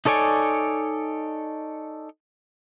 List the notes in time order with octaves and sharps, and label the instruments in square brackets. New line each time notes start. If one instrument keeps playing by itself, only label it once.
[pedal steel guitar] D#4 A4 C#5 D5 G#5